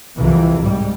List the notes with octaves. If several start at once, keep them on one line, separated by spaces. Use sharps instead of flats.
C2 F2 C3 E3
G#2 G3